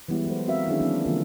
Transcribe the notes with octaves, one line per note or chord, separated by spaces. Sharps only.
E3 G3 G#3 B3 E4 G4
F#3 G#3 A4 C5
C4 F#4 A#4 E5 F5
D#3 F#3 C#4 D4 E4 G#4
F3 F#3 A#3 C4 D4
D3 E3 F3 A#3 F4 A#4